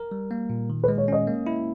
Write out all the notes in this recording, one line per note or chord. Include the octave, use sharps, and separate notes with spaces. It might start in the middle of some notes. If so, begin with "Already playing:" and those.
Already playing: A#4
G3
A#3
A#2
D#3
B4
G#3
C#5
C#4 D#5
A#3
E4